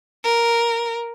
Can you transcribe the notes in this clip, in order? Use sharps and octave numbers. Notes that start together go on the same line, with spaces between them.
A#4